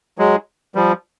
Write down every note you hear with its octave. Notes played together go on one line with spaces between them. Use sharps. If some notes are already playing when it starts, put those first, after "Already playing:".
F#3 G#3
F3 G3